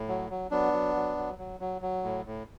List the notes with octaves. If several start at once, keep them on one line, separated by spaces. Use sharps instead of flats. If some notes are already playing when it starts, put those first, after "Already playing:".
Already playing: A2
F#3
F#3
F#3 B3 D4
F#3
F#3
F#3
F#3
F#3
F#3
A2
A2